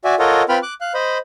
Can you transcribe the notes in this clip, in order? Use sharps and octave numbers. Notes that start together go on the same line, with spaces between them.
F#4 D5 E5 G#5
F4 A4 A#4 C#5 D#5 F#5
C4 F4 B4 G5 B5 F6
D6 F#6
F5 F#6
C5 D#5 B5